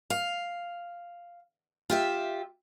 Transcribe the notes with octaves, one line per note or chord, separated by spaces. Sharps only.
F5
F4 G4 E5